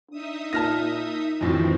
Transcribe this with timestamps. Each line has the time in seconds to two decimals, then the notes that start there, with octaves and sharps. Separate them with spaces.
0.11 D4 D#4 E5 D#6
0.53 A#2 A5 F6 A#6
1.41 F2 A2 D#3 E3 F#3 C4 D4